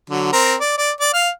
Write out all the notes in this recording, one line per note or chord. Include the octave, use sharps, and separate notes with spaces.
D3 F#3
C4 A#4
D5
D5
D5
F5 F6